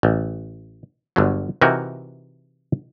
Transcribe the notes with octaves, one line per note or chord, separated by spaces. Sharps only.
A1
G1 D3 F#3
C3 E3 D#4 F#4 A#4